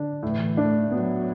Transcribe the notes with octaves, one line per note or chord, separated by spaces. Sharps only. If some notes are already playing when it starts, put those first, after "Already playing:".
Already playing: D3 D4
A2 E3
A3 D4
F#3 B3